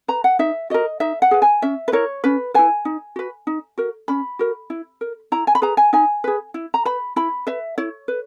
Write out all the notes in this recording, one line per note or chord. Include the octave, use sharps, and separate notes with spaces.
B4 A#5
F#5
D#4 E5
F#4 A#4 D#5
D#4 E5
F#5
G#4 B4
G#5
C#4 E5
B4
E4 A#4 C#5
C#4 B4
E4 B4 G#5
D#4
F#4 B4
D#4
F#4 A#4
C#4 B5
F#4 A#4
E4
A#4
E4 A#5
G#5
B5
G#4 B4 A#5
G#5
D#4 G#5
G#4 B4
E4
A#5
B4 B5
E4 B5
B4 E5
E4 C#5
B4